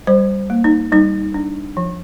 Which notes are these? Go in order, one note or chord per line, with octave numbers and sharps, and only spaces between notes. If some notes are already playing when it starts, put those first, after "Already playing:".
G3 C5
A#3
D#4
G3 D#4
D4
F3